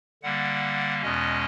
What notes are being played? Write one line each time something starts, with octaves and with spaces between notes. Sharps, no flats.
D3 G3 A#3 F#5
E2 B2 G#3 C#4 D#5